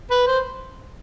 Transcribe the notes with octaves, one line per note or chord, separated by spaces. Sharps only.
B4
C5